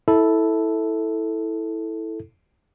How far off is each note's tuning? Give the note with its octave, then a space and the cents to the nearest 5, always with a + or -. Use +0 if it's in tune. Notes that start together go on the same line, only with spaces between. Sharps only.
E4 -15 A4 +0